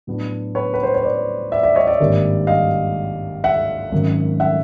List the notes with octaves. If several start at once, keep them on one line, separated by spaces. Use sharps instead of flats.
A2 F#3 B3 D4
B4 C#5
B4
C5
C#5
C5 D5
D5 E5
D5 E5
C#5 D#5
D5 E5
G#1 G2 D#3 G3 A#3
D#5 F5
E5 F#5
G#1 F#2 D#3
E5 F#5